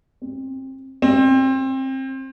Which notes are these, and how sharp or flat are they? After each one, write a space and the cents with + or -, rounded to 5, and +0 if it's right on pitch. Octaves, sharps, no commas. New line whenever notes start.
C4 +25
C4 +25